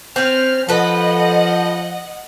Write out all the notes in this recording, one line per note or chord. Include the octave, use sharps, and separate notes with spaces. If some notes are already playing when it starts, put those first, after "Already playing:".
C4 C#4 F6
F3 A4 B4 D#5 F#5